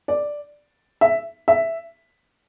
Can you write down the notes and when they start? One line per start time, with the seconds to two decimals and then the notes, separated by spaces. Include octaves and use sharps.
0.08 D5
1.01 E5
1.48 E5